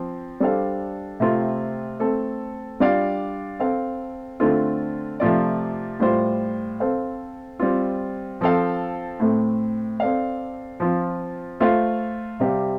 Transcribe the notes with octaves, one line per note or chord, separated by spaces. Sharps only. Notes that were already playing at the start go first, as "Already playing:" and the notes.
Already playing: F3 C4
G3 D4 A4 C5 F5
C3 A3 C4 F4
A3 C4 A4
G3 D4 F4 D5 F5
C4 A4 F5
D3 A3 C4 F4 A4
C3 F3 A3 F4 D5
A2 G3 F4 C5
C4 A4 C5 F5
G3 C4 F4
F3 C4 A4 F5
A2 A3 C4
C4 A4 D5 F5
F3 C4 F4
A3 F4 C5 F5
C3 G3 C4 G4 F5